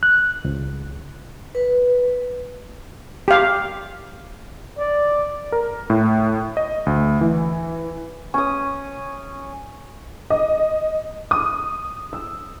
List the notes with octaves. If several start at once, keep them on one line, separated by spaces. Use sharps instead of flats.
F#6
C#2
B4
G4 F5
D5
A#4
A2
D#5
D2
E3
C#4 D#6
D#5
D#6
E6